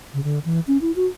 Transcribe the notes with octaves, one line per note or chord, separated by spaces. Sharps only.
C#3
D3
E3
C#4
E4
F#4